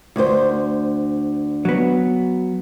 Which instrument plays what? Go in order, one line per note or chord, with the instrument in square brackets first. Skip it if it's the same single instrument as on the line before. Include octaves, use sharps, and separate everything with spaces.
[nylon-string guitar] D2 C5
[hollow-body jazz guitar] F#3 B3